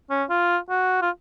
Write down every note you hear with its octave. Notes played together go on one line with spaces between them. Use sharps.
C#4
F4
F#4
F4